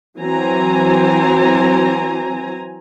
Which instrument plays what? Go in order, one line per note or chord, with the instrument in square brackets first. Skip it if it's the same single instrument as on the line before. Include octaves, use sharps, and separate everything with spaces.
[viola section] E3 F#3 C4 G#5 A#5